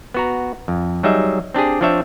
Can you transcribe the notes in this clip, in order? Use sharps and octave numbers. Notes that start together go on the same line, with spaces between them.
B3 F#4 A#5
F2
F#3 G3 D#4 G#4 E5
C4 D4 G4 G#4
F3 C4 D4 C#5 E5